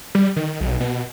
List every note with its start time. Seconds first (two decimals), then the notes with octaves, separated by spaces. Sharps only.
0.15 G3
0.36 D#3
0.61 B1
0.80 B2